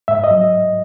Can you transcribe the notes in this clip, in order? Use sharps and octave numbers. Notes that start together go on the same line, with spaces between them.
G#2 E5
D#5
F#3